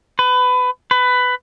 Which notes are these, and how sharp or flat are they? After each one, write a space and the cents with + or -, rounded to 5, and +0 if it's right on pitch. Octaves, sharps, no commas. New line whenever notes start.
B4 +25
B4 +15